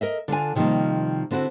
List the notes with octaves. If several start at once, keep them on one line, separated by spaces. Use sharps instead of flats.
A#4 D#5 E5
D3 D4 F4 G#5
C3 D#3 F3 G3 A#3
D3 C4 E4 F#4